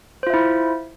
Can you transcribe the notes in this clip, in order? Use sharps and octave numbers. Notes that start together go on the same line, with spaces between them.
E4 F4 C5 E5